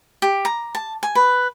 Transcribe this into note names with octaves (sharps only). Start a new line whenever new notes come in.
G4
A#5
A5
G#5
B4